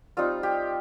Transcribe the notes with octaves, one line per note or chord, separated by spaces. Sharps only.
G3 C4 D#4 F4
G4